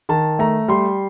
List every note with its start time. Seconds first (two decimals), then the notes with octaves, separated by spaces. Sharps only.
0.09 D#3 A5
0.39 A3 A#5
0.68 G3 C6